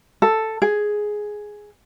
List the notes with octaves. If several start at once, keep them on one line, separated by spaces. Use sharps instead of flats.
A4
G#4